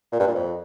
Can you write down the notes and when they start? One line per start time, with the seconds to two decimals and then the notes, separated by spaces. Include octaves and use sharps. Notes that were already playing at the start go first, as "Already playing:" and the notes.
0.12 A#2
0.20 G2
0.27 A#2
0.34 F2